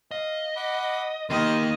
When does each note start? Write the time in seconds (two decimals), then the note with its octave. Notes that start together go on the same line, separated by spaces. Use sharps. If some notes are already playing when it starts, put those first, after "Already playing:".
0.11 D#5 F5
0.56 F#5 B5 D6
1.30 D#2 D#3 A#3 G4 A#4 D#5 C6